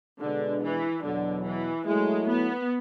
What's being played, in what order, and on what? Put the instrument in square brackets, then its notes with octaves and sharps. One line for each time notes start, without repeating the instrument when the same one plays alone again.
[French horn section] B2 G#3 D4 G#4 B4 [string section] D3
[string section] E3
[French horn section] E2 B2 F#3 [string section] D3
[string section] E3
[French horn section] F#3 A3 E4 [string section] G#3
[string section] B3